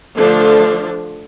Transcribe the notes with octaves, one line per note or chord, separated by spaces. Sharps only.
D3 F3 A3 D4 A4